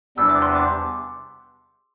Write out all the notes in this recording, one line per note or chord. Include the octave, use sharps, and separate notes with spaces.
E2 C3 G3 B3 D4 E6
D6
C6
D6